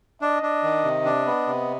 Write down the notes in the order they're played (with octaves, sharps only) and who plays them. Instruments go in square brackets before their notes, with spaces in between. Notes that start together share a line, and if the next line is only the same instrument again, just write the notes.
[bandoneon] D4 [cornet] D#5
[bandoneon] D4
D#3
C3
D4
B3
C3